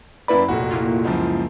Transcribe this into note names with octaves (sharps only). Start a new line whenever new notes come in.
F#2 A#3 E4 B4 D5 B5
F1 B1 A#2 F#4
A#3 E4 F4
C#2 F#2 F3